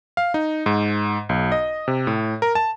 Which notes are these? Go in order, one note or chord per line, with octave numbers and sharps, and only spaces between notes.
F5
D#4
G#2
B1
D#5
C3
A2
A#4
A5